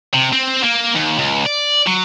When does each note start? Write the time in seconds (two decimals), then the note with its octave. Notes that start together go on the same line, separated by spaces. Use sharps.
0.14 C3
0.33 C4
0.63 A#3
0.95 D#2
1.19 C#2
1.46 D5
1.87 F#3